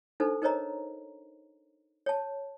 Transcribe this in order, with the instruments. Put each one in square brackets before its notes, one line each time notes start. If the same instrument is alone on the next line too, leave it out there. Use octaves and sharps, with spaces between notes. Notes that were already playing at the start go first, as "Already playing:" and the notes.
[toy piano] D4 D#4 A4 B4 C5
D#4 A#4 C5 C#5 D#5 A#5
C#5 A5